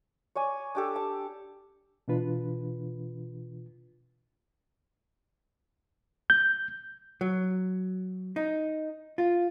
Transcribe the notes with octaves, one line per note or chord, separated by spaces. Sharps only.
C#5 D5 G#5
D4 G4 A4
A5
B2 E3 D4 F4 B4
G6
F#3
D#4
F4